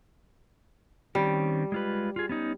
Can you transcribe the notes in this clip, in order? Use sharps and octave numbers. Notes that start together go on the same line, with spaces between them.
D#3 G3 C4 C#4
G#3 F4 B4
F4 G#4
B3 C#4 D#4